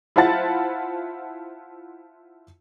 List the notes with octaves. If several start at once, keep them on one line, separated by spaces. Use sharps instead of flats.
E4 F4 C5 F#5 A5 A6